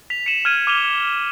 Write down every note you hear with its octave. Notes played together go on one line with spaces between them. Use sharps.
B6 F7
C#7 D#7 E7 F#7
F6 G#6 D#7
D6 F6 D#7 F7 G7